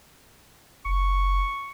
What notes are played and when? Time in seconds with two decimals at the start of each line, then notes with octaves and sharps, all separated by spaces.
0.85 F#1 C#6